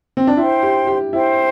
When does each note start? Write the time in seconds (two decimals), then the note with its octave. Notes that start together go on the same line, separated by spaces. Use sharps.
0.17 C4
0.27 D4
0.37 E4 C5 G5 C6
0.63 G4
0.87 G4
1.13 E4 C5 G5 C6